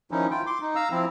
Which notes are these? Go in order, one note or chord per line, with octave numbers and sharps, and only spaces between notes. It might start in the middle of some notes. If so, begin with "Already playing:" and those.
D#3 F3 C#4 D#4 E4
E4 F4 G5
C6 D6
D#4
F5 A#5 E6
F3 C4 E4